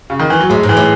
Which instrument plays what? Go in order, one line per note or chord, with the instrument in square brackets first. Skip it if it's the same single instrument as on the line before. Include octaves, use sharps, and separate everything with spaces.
[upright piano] C#3
D#3
E3
F#3
[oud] A2 [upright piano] G#3
[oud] G#2
[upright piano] E3
[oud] A2